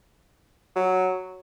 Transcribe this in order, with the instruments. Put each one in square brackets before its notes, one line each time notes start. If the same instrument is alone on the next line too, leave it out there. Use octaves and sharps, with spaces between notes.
[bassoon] F#3